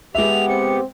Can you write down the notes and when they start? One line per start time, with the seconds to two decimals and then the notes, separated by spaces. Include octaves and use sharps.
0.15 G#3 B3 G4 E5 F7
0.49 C4 C#7